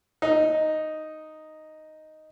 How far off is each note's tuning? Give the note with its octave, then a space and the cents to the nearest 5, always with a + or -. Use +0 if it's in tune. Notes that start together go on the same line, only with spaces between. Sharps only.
D#4 +0